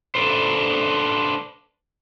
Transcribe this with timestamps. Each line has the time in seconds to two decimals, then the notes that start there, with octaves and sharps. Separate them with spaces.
0.15 D4 A4 B4 C5